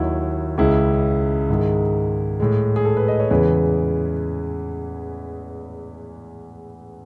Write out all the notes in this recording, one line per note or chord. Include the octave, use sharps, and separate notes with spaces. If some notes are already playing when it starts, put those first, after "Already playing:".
Already playing: D#2 D#3 F#3 E4 F#4
C#2 C#3 G#3 E4
G#2 D#3 G#3
A2 G#3
G#4
A4
B4
D#5
C#5
E2 C#3 E3 G#3 B4